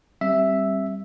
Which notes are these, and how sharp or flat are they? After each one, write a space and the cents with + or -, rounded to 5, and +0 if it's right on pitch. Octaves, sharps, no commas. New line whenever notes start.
G3 +0 C4 +20 E5 +0